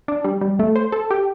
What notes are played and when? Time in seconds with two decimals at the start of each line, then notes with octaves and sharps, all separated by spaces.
0.08 D4
0.24 G3
0.41 G3
0.59 A3
0.76 C5
0.92 A4
1.11 G4